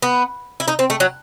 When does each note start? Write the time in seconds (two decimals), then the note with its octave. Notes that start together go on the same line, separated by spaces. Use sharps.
0.02 B3
0.60 E4
0.68 D#4
0.79 C4
0.90 A3
1.00 F#3